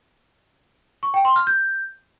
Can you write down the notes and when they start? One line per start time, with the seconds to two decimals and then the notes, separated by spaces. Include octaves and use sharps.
1.03 C#6
1.14 G5
1.25 C6
1.36 F6
1.47 G6